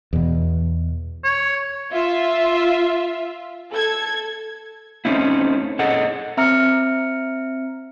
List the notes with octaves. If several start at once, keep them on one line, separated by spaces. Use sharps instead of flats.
E2 B2
C#5
F4 E5
A4 G#6
A3 C4 C#4 D#4 E4
G#4 A4 D#5 F#5
C4 E5 A#5 F6 C#7